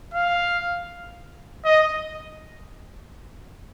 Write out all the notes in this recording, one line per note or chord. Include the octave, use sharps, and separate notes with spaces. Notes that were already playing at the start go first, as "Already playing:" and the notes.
F5
D#5